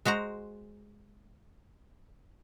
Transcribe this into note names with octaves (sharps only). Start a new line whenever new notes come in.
G#3 F#4 C5 A#5